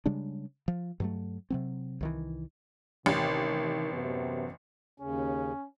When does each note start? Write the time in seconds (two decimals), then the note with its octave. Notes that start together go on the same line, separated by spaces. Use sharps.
0.06 C#3 G3 G#3 D4
0.68 F3
1.00 G2 F#3 A3
1.50 C3 F#3 C4
2.01 C2 D#3 E3
3.06 A1 C3 D#3
3.93 F#2 C3 B3
5.00 D#2 C#3 C#4